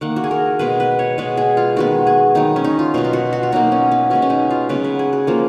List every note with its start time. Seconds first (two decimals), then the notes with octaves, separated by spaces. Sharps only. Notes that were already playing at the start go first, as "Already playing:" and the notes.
0.01 D#3 A#3 F#5
0.16 F#4
0.24 G#4
0.31 A#4
0.59 B2 G#3 B3 B4
0.80 B4
0.99 C#5
1.18 B2 G#3 B3 B4
1.37 G#4
1.57 F4
1.76 D#3 G#3 B3 F#4
2.07 G#4
2.35 D#3 F#3 B3 D#4
2.56 C#4
2.64 D#4
2.79 F4
2.94 B2 F#3 B3 F4
3.04 F4
3.13 F#4
3.33 F#4
3.43 F4
3.52 B2 F#3 A#3 D#4
3.72 C#4
3.92 B3
4.10 B2 G#3 B3 C#4
4.22 C#4
4.30 D#4
4.50 F4
4.69 C#3 F#3 B3 B4
4.84 B4
4.99 G#4
5.13 F#4
5.27 F3 A#3 F4